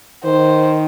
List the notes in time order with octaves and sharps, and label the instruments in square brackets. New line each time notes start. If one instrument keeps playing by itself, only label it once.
[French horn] D#3 [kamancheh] C5